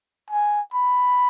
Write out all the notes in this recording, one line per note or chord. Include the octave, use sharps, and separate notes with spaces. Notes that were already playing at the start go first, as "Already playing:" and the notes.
G#5
B5